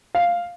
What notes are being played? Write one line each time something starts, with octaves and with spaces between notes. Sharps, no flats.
F5